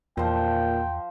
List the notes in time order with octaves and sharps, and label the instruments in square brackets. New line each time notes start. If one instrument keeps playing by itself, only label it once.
[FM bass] E2 [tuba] A#2 [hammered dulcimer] F3 C5 [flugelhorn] G5